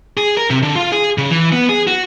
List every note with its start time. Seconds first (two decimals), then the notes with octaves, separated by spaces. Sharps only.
0.17 G#4
0.37 A#4
0.50 C3
0.62 D3
0.75 F4
0.92 G#4
1.18 C#3
1.31 E3
1.52 B3
1.69 G#4
1.87 F#4